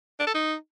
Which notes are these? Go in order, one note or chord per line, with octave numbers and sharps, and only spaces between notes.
D4
A4
D#4